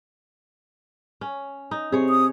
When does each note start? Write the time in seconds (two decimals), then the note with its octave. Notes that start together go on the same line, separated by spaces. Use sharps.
1.21 C#4
1.71 D#4
1.92 C3 G#4 C#5
2.09 D#6